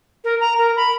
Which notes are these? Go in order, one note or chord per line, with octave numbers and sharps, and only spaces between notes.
A#4
A#5
A#4
B5